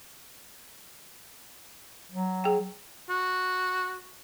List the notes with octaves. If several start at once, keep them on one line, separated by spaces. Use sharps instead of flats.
F#3
G#4 G5
F#4